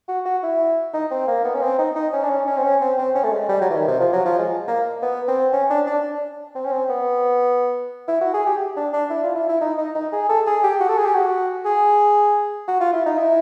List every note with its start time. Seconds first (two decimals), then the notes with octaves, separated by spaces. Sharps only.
0.08 F#4
0.26 F#4
0.43 E4
0.94 D#4
1.11 C4
1.28 A#3
1.45 B3
1.55 C#4
1.62 C4
1.79 D#4
1.96 D#4
2.13 C#4
2.24 D4
2.30 C#4
2.47 C#4
2.58 C4
2.64 C#4
2.81 C4
2.98 C4
3.15 C#4
3.24 A3
3.32 G#3
3.49 G3
3.61 F#3
3.70 E3
3.75 D#3
3.88 C3
4.00 F3
4.13 F#3
4.26 F3
4.39 G#3
4.68 A#3
5.02 B3
5.28 C4
5.53 C#4
5.70 D4
5.87 D4
6.55 C4
6.65 C#4
6.72 C4
6.90 B3
8.08 E4
8.21 F#4
8.34 G#4
8.46 G4
8.76 D4
8.93 D4
9.10 E4
9.23 F4
9.36 E4
9.49 E4
9.61 D#4
9.78 D#4
9.95 D#4
10.12 G#4
10.29 A4
10.46 G#4
10.64 G4
10.81 F#4
10.89 A4
10.98 G#4
11.06 G4
11.15 F#4
11.65 G#4
12.68 F#4
12.81 F4
12.93 E4
13.06 D#4
13.18 E4